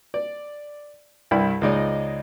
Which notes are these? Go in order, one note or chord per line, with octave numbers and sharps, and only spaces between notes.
D5
C2 G2 E4 D5 B5
C#2 G#3 D#4 D5 D#5